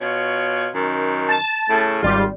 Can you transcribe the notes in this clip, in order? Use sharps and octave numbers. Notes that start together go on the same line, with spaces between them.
B2 F4 C#5
F#2 D#3
A5
A2 C#3 A3
G#1 G3 F4